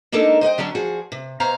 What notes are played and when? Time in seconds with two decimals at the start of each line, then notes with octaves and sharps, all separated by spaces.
0.12 G#3 A#3 D4 D#4 A4 A#4
0.41 C5 D#5 F#5 G5
0.58 D3 F#3 C#4 D4
0.75 F3 F#4 G#4
1.12 C3
1.40 B2 C5 C#5 F5 A#5